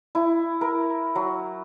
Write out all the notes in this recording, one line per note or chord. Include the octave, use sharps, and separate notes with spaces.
E4
A#4
F#3